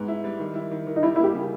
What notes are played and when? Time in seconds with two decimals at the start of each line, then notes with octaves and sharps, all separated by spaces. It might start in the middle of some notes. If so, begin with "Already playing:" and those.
Already playing: G#2 B3
0.08 E4
0.24 G3
0.39 D#3
0.55 E4
0.71 D#3
0.86 D#3
0.96 D#4
1.03 G3 E4
1.16 E4
1.19 A#3 G4
1.34 C#3